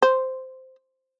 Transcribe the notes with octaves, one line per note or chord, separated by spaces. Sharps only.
C5